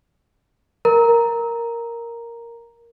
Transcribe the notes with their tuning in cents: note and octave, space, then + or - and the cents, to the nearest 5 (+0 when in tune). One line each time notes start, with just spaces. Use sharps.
A#4 +0 A#5 +0